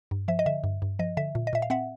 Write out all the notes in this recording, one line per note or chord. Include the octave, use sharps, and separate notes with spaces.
G2
F3 E5
D#5
D3 E5
G2
G2
F3 D#5
D3 E5
A#2
D#5
A#2 E5
F5
C4 E5 F#5